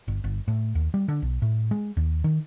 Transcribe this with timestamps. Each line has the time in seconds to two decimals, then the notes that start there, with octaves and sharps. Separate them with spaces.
0.08 G1
0.24 G1
0.48 A2
0.75 D#2
0.94 G3
1.08 D3
1.22 B1
1.42 A2
1.71 G#3
1.97 D#2
2.24 D#3